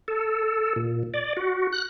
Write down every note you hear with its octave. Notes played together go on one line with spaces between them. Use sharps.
A4
A#2
D5
F#4
F#6